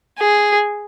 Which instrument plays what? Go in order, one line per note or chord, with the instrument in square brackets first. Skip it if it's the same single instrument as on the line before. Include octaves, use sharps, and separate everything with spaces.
[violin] G#4